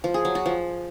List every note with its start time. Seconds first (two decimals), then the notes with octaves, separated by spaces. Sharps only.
0.04 F3
0.14 G#4
0.25 F#3
0.35 F#4
0.46 F3